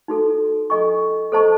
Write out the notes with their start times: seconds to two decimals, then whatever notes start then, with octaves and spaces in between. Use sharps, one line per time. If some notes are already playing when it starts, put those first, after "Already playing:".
0.08 D#4 F#4 A4
0.70 A4 D#5 G#5 C#6
1.32 A4 C5 D#5 A5 C#6